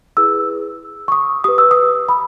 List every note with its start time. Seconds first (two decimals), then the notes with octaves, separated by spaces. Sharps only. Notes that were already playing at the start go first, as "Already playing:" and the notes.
0.17 E4 G#4 B4 E6
1.08 C#6
1.12 D#6
1.44 G4 B4 D#6
1.58 E6
1.71 D#6
2.09 B5